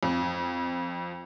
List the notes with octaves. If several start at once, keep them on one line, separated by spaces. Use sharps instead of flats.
F2